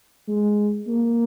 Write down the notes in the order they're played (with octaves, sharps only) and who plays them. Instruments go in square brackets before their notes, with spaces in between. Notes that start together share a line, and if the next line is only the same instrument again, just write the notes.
[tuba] G#3
A#3